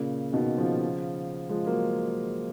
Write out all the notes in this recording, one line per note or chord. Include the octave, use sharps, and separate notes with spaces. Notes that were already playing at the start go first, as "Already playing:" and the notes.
Already playing: A#2 C#3
B2 D#3
C#3 F3
F3 G#3
F#3 A#3